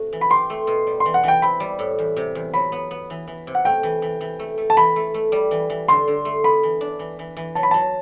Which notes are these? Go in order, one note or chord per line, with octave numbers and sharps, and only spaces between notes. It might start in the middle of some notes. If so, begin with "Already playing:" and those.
Already playing: C3 A3 F#4
E3
B5
G4 C6
A3
B2
G3
C6
E3
F#5
E3 G5
C4 B5
G3
A2
E2
C3
E2
F#3 B5
B3
B3
E3
E3
C3
F#5
A3 G5
E3
E3
E3
A3
A3
A5
E3 B5
A3
A3
G3
E3
E3
D3 C6
D3
A3
B3 B5
E3
D4
E3
E3
E3
F#3 A5
B5
F#3 A5